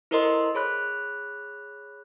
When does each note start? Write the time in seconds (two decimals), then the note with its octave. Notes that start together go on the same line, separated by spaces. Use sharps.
0.11 E4 A4 A#4 C5 D#5 C6
0.55 G#4 C#5 B5 F#6